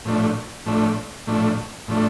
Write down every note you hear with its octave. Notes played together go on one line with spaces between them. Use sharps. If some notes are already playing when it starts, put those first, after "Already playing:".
A2 F3 A3 D4
A2 F3 A3 D4
A2 F3 A3 D4
A2 F3 A3 D4